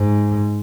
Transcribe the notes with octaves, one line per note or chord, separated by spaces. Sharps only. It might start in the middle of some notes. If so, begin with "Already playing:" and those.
Already playing: G#2